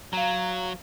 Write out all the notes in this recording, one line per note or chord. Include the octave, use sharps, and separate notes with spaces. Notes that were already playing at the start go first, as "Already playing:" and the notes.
F#3 F5 A#5